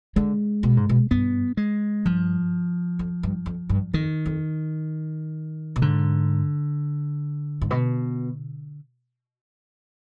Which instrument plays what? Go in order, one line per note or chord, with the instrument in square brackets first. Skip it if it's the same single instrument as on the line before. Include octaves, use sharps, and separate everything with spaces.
[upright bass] D3 [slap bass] G#3
[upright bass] B2
G#2
B2
[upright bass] G2 [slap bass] B3
[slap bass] G#3
[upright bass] G2 [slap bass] F3
[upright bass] F2
G2
F2
G2
[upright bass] F2 [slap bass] D#3
[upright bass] F2
B2
[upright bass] G#2 [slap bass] D3
[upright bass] G#2
B2